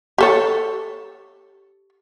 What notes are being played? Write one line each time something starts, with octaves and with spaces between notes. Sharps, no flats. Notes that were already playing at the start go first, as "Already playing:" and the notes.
G4 A4 C#5